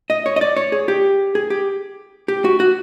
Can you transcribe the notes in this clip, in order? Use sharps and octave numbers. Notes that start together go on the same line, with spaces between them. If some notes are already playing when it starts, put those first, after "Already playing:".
D#5
C#5
D#5
D5
C#5
G#4
G4
G#4
G4
G4
F#4
F#4